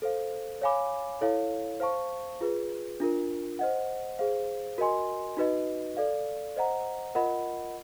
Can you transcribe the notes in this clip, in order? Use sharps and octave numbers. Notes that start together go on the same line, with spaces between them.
A4 C5 F5
C#5 F5 G#5 B5 D6
E4 A4 C#5 F5
C5 F5 A5 C#6
F4 G#4 B4
D4 F4 A#4
C5 D#5 F#5
G#4 C5 F5
F#4 A#4 D#5 G#5 C6
D#4 F#4 B4 D#5
A4 D5 F5
C5 D#5 F#5 A#5
F4 A#4 D#5 F#5 B5